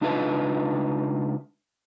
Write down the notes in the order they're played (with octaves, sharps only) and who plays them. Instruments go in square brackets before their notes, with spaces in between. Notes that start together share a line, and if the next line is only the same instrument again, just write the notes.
[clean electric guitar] C#2 D4 D#4 F4 B4 E5